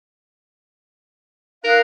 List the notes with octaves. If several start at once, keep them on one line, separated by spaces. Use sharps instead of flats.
D#4 A#4 F5 F#6